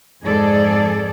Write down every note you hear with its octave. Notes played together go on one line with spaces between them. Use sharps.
F2 G#2 G#4 A4 D5